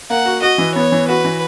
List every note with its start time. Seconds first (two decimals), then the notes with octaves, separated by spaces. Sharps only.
0.10 A#3 F#5
0.26 F#4
0.42 F#4 D#5
0.58 E3
0.75 B3 C#5
0.92 E3
1.08 F#4 B4
1.24 E3